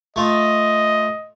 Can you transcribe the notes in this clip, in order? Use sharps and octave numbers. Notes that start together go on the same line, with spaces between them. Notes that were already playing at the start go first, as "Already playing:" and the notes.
A3 F4 D#5